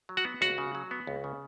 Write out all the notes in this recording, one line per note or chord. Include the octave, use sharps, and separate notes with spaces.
F#3
F#4 F#5
B3
C#2 F#4 F#5
C#3
F#3
B3
C#2
C#3